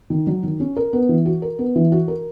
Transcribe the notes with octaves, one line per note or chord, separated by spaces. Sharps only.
D#3
F#3
D#3
C#4
A#4
B3
E3
F#4
A#4
B3
E3
F#4
A#4